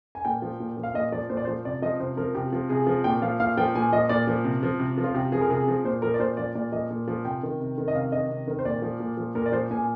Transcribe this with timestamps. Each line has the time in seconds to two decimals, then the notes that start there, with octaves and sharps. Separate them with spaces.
0.15 G#5
0.25 A#2 G5
0.42 F3
0.60 A#2
0.77 F3
0.83 F5
0.94 A#2 D#5
1.12 F3 D5
1.30 A#2 C5
1.37 D5
1.45 F3 C5
1.65 C3 D5
1.82 F3 D#5
2.00 C3 C5
2.17 F3 A#4
2.35 C3 G4
2.53 F3
2.69 C3 G#4
2.87 F3
3.04 A#2 G5
3.22 F3 F5
3.40 A#2 F5
3.57 F3 G5
3.75 A#2 G#5
3.93 F3 D#5
4.09 A#2 D5
4.27 F3
4.44 C3
4.63 F3
4.79 C3
4.98 F3
5.04 F4
5.15 C3 G4
5.32 F3 G#4
5.41 A#4
5.50 C3 G#4
5.68 F3
5.84 A#2 C5
6.02 F3 A#4
6.14 D5
6.19 A#2 C5
6.37 F3 D5
6.55 A#2 D5
6.72 F3 D#5
6.90 A#2
7.08 F3
7.25 C3 G5
7.43 D#3
7.60 C3
7.78 D#3
7.88 D#5
7.95 C3 F5
8.12 D#3 D#5
8.30 C3
8.47 D#3 A#4
8.59 C5
8.65 A#2 D5
8.82 F3
9.00 A#2
9.17 F3
9.35 A#2 A#4
9.46 D5
9.52 F3 C5
9.71 A#2 G#5